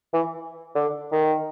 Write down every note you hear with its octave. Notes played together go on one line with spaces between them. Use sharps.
E3
D3
D#3